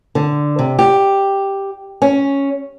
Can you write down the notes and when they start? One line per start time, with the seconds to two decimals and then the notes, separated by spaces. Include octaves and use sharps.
0.15 D3
0.59 C3
0.79 G4
2.02 C#4